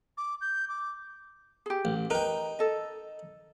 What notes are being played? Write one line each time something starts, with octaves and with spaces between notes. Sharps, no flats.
D6
G6
D6
G4 G#4
A1
D#4 A#4 B4 G5 A#5
A4 D#5